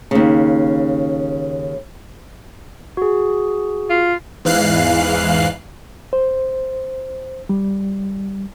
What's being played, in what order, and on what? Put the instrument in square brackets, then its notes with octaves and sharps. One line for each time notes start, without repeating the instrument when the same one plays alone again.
[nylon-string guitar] D#2 C#3
[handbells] F#4 G#4
[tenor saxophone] F4
[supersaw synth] E2 G#2 E3 F5 F#6 C7
[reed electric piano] C5
G3